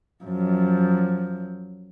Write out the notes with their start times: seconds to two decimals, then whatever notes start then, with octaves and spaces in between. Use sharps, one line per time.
0.24 F#2 F3